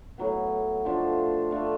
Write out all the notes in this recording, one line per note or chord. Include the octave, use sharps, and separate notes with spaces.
A2 F#3 B3
F3 A3 D4 F4
F3 A3 D4 F4